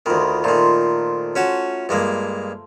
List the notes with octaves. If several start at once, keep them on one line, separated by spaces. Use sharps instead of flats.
D2 D#3 F4 A#4 B4
A#2 D#3 A3 F4 C5
C#4 F#4 A5
G2 G#3 A#3